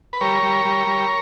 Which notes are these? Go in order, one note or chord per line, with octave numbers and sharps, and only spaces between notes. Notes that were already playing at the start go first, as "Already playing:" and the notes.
B4
G3 A#4 C#5
G3
G3
G3